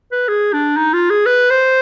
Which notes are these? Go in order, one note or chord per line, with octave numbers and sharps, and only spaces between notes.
B4
G#4
D4
D#4
F4
G#4
B4
C5